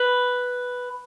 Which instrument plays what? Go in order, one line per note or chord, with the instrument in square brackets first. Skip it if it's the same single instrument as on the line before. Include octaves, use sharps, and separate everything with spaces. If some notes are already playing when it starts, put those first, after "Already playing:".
Already playing: [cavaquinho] B4